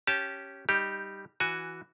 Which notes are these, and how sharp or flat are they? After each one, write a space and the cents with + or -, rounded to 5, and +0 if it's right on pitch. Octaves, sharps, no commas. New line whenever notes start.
C#4 -5 G4 -10 A5 -15
G3 +0 D#4 +0 G4 +0
E3 +0 F#4 +0 G#5 +0